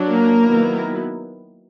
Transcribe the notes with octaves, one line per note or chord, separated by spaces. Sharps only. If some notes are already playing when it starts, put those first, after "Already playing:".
Already playing: F#3 D4
A#3 A#4
D#3 F#3 B3 E4